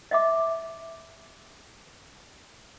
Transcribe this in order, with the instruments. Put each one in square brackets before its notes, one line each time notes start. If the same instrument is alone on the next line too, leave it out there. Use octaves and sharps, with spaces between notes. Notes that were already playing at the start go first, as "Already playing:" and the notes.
[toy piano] D#5 E5 D6